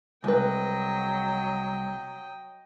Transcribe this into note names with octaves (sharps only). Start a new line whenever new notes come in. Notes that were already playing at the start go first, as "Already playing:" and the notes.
C2 F#3 G#3 B4 D#5 G5